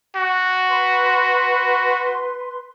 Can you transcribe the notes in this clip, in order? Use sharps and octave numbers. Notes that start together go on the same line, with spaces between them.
F#4
B4 C6